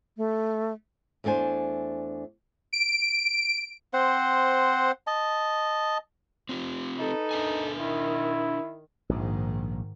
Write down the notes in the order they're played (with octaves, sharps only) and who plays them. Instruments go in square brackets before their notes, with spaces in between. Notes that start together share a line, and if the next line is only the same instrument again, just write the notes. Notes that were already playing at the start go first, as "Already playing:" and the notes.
[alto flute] A3
[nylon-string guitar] E2 A3 D4 C5 G#5
[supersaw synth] D7
[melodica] C4 C5 F#5
D#5 A5
[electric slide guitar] C4 F4 G4
[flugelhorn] D#4 [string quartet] A4 B4
[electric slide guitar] D4 A#4 G#5
[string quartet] D#3 [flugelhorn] E4
[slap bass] A#1 [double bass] G#2 D#3